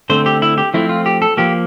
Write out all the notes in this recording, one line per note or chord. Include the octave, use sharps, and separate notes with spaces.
D3 A3 C4 C5
G4
E4
G4
F3 A3 C4 E4
F4
G4
A4
F3 A#3 G4